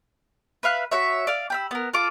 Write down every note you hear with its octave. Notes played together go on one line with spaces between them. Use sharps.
B4 E5 F5 F#6
F#4 C#5 E5
D5 F5
G4 B5 E6
B3 A#4
F4 A4 D6